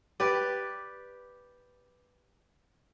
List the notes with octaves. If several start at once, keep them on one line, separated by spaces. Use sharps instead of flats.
G4 B4 D5